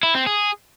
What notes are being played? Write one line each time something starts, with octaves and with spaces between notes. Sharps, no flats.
E4
C4
G#4